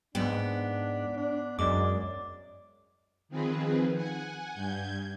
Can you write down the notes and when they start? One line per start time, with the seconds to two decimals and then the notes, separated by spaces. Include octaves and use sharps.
0.15 G#2 B3 D4 G5
1.17 D4
1.59 F#2 G#3 D5 D6
3.29 D#3 F3 C4 G#4 B4
3.94 F#5 G#5
4.52 G2 G6 G#6